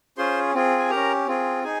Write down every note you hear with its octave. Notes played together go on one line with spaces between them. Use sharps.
C#4 F4 G#4 C5 C6
C4 F4 G#4
G#5
C#4 G4 A#4 A#5
C4 F4 G#4
D#4 G#4 G#5